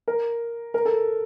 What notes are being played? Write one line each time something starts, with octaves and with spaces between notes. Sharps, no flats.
A#4
A#4
A4